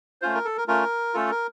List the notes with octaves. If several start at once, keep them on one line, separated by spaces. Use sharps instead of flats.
A3 C#4 F4 C5
A#4
A4
A#4
A3 C#4 F4 A#4
A3 C#4 F4 A4
A#4